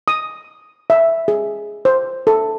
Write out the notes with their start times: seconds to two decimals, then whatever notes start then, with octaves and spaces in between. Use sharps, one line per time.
0.08 D#6
0.90 E5
1.28 G#4
1.85 C5
2.27 A4